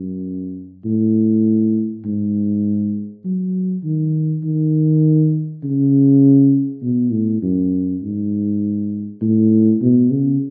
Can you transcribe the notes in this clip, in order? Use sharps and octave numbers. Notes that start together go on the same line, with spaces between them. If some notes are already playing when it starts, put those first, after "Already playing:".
Already playing: F#2
A2
G#2
F#3
D#3
D#3
C#3
B2
A2
F#2
G#2
A2
B2
C#3